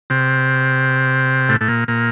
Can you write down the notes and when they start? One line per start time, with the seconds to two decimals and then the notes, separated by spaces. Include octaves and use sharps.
0.10 C3
1.49 A2
1.61 A2
1.68 A#2
1.88 A#2